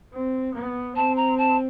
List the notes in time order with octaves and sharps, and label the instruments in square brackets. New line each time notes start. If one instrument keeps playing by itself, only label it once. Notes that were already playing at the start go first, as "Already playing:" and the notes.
[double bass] C4
B3
[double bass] C4 [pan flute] A5
[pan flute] A#5
A5